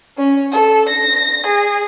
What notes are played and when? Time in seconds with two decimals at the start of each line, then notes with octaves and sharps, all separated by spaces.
0.17 C#4
0.52 A4
0.87 A#6
1.47 G#4